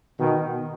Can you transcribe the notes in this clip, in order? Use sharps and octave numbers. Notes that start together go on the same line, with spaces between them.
B2 D#3